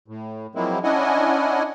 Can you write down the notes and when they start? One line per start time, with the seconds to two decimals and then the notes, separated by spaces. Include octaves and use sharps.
0.08 A2
0.55 F3 F#3 G#3 A#3 C4 E4
0.84 C#4 D4 E4 D#5 F#5 G#5